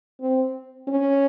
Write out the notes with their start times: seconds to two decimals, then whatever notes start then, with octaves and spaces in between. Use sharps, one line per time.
0.21 C4
0.88 C#4